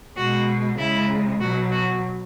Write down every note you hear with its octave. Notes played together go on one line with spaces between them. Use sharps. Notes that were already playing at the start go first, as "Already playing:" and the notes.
B2 G#3 F#4
C#3 G#3 E4
B2 F#3 F#4
F#4